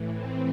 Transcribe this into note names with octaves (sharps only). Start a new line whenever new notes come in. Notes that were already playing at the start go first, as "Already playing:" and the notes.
Already playing: A2 E3
C4